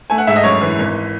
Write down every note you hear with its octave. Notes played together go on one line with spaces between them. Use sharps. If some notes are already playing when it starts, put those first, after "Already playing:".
A3 G#5
F#5
G#2 E5
D#5
F#2 C#5
E3
G#1